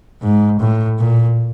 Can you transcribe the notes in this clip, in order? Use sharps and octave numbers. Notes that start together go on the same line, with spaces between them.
G#2
A2
A#2